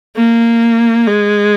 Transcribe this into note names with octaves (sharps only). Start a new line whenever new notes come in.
A#3
G#3